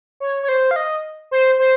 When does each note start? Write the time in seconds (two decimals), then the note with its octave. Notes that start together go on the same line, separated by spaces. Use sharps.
0.20 C#5
0.43 C#5
0.49 C5
0.71 F5
0.76 D#5
1.31 C5
1.59 C5